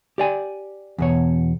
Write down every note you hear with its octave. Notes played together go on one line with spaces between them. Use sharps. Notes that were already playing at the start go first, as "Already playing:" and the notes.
G4 D5 G#5
E2 B2 C#5